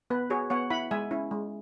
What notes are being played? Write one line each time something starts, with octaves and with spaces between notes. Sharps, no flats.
B3 B4
F#4 G#4 C#5
B3 C#5 F#5
E4 F#5 B5
G#3 E5 G#5
C#4 E4
G#3